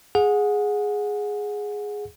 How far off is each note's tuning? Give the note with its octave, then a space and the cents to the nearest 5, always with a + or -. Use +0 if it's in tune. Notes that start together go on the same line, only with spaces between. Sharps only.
G#4 +0 F#5 -25